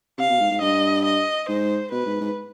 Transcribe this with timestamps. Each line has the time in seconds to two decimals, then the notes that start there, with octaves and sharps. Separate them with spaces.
0.18 C3 F5
0.29 B2
0.40 G#2
0.51 G#2
0.61 G2 D#5
1.05 D#5
1.48 G#2 C5
1.92 B2 B4
2.06 G#2
2.21 G#2